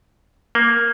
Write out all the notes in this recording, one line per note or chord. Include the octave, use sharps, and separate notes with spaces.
A#3